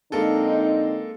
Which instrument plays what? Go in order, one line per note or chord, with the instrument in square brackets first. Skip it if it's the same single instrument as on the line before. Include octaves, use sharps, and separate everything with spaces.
[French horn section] D3 C4 D#4 [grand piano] G#3 A#3 A4